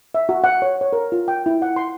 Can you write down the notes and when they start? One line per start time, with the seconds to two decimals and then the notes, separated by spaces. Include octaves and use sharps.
0.14 E5
0.29 F#4
0.44 F#5
0.62 C#5
0.81 C#5
0.93 A#4
1.12 F4
1.28 G5
1.46 E4
1.62 F#5
1.76 C6